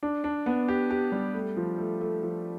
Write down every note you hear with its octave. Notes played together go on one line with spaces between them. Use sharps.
D4
D4
B3
G4
G4
G3
A3
F3
A3
A3
F3